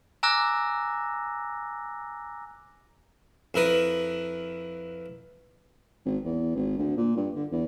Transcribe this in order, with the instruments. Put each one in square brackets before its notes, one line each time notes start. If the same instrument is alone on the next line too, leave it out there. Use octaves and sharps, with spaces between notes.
[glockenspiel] G#5 A#5 D6 E6 F#6 A#6
[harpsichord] F2 E4 A#4 B4 D#6
[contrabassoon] G#1
E2
G#1
D2
A#2
G2
D3
E2